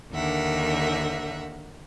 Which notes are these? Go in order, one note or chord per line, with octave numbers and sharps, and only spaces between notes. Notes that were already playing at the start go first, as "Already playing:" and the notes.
D#2 D3 A#4 E5 F#5